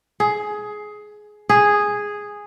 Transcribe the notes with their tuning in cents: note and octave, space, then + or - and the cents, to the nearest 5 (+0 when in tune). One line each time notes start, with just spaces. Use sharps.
G#4 +15
G#4 -5